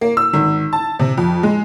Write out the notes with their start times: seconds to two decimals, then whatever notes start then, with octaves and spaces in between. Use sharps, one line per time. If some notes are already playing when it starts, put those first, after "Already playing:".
0.01 A#3
0.17 E6
0.33 G#1
0.73 A5
0.99 C3
1.18 F2
1.43 G#3